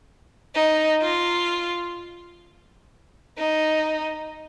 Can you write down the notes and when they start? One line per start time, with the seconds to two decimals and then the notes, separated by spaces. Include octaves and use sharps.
0.55 D#4
1.02 F4
3.37 D#4